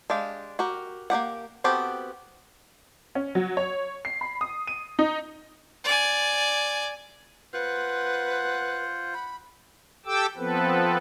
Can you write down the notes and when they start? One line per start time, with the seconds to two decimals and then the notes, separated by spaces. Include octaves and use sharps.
0.10 G#3 D4 G4 F5
0.59 F#4 G4 A#4
1.10 A#3 D#4 G4 F#5
1.64 B3 C4 F#4 G4 A4
3.15 C#4
3.35 F#3
3.57 C#5
4.05 C7
4.21 B5
4.41 D#6
4.67 D#7
4.99 D#4
5.84 D5 G#5
7.53 F4 B4 C5 F#5
9.14 B5
10.06 G4 A4 G5 D6 E6
10.37 F3 B3 C4 A4 B4